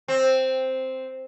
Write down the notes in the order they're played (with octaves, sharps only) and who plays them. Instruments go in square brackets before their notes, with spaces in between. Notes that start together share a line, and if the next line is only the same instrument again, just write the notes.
[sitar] C4